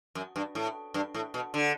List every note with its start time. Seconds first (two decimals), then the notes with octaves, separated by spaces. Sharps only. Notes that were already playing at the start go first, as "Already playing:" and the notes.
0.15 F#2
0.36 G2
0.55 A2
0.94 G2
1.14 A2
1.34 B2
1.54 D3